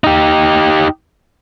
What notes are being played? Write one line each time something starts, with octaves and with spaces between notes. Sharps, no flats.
D#4 G4